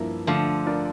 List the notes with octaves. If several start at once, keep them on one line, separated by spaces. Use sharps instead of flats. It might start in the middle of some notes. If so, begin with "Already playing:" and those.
Already playing: G2 F3 A#3 E4 A#4
D3 F3 A3
D4 F4 A#4 D5